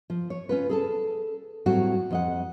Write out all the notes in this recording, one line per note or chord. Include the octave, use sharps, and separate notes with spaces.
F3
C#5
C#4 F4 B4
G#4 A4 A5
A2 F#3 G3 C4 F#4
F2 D#5 F#5